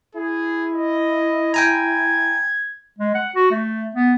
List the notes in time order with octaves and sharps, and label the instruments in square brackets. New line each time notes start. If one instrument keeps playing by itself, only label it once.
[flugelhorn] E4 [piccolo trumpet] G#4
[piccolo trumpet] D#5
[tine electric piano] G5 G#5 A#5 [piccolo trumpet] G#6
[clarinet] G#3
F#5
F#4
A3
B3